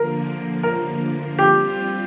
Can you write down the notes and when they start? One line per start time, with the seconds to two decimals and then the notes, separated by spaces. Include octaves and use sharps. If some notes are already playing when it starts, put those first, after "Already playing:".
Already playing: D3 F3 A#3 A#4
0.63 A#4
1.39 G3 C4 F4 G4